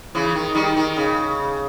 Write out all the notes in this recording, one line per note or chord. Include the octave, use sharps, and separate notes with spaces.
C#3 E3
D#3
D#3 G3
D#3
C#3